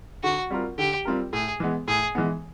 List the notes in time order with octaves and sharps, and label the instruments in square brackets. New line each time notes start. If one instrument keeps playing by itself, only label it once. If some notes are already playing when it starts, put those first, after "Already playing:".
[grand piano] D3 [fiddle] F#4
[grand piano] G3 C4 F4 A#4
[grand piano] D3 [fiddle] G4
[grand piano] G3 C4 F4 A#4
[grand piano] A2 [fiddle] G#4
[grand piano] E3 G#3 B3
[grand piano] A2 [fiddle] G#4
[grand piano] E3 G#3 B3